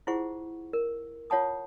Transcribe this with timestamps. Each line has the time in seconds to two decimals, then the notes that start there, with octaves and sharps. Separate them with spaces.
0.07 E4 F4 G#4 C5 F#5 C#6
0.73 A#4
1.30 F4 C#5 F#5 A5 D#6